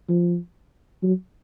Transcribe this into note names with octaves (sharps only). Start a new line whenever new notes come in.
F3
F#3